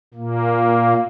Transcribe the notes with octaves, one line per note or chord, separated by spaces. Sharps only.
A#2 A#3